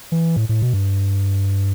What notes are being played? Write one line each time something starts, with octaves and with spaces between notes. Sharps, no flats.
E3
A2
A2
B2
G2